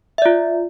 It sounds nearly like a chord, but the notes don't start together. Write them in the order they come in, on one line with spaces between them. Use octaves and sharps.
E5 D5 F4